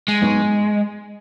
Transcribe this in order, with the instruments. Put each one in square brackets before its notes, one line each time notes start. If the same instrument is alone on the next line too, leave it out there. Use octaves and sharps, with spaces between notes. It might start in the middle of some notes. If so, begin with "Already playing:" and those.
[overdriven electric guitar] G#3
[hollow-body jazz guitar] G#2 F#3 B3 D#4